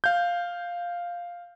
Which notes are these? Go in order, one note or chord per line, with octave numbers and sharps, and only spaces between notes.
F5 G6